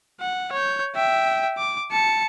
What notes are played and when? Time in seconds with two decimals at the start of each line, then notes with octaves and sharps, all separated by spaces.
0.21 F#5
0.52 C#5 G6
0.96 E5 G5
1.58 D6
1.91 A5 C#7